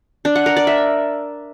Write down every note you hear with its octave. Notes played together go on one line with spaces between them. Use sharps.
D4
F#5
A#4
D5
E5